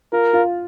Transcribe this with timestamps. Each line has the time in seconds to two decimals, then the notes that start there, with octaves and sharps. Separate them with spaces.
0.13 F4 A#4
0.33 F4